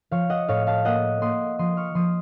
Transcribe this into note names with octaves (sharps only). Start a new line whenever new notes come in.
F3 C#5 F5
D#5 F#5
A2 C#5 F5
F5 A5
A#3 D#5 F#5
A#3 C6 D#6
F3 C6 D#6
C#6 F6
F3 C6 D#6